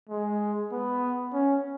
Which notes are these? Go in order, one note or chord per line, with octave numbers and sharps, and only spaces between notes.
G#3
B3
C#4